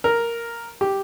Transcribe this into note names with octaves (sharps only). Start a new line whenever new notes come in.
A#4
G4